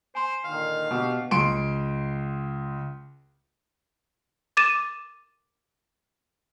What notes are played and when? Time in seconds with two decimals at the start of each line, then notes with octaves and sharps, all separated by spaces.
0.15 C5 G#5 C6
0.44 A#2 D3 D#3 F5
0.91 B2 D4 G4
1.31 C#2 C6 D7
4.57 D6 A6 D#7 E7